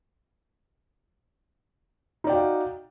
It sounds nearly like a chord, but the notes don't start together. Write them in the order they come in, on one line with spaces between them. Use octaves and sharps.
D#4 D5 G5 F#4 F5